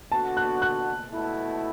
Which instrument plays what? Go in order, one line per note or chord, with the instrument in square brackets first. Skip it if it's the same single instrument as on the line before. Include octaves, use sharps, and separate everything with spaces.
[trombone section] D3 B3 F#4 [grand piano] A5
[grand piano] F#6
F#6
[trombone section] B2 A3 E4